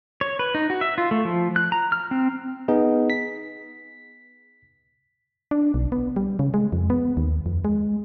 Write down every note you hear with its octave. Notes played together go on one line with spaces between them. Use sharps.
C#5
B4
D#4
F#4
E5
F4
A3
F3
F#6
A#5
F6
C4
B3 D#4 G#4
B6
D4
B1
B3
G3
C#3
G#3
F2
B3
D#2
F2
G#3